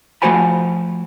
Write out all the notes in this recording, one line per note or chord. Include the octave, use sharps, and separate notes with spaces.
F3 A3 F#4 C5 G#5 B5